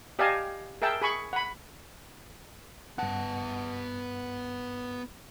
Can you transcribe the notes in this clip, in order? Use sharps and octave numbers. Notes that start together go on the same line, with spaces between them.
G4 D5 D#5 F5 G#5 A5
G#4 A#4 E5 G5 A5 E6
G#4 B5 C#6
F#5 B5
G2 B3 F#5 A5